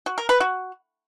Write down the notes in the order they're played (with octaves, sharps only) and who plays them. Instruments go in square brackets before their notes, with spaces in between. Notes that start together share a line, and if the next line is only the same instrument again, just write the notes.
[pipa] F#4
A#4
B4
F#4